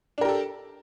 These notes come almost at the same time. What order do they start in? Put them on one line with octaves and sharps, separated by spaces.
D4 A#4 G4 A4